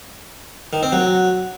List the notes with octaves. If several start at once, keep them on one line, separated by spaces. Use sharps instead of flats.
D#3
C4
F#3